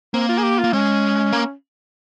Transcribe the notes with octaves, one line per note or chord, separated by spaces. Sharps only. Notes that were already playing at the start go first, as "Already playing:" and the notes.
A#3 C4
F4
G#4
G4
A#3 F4
G#3 C#4
A#3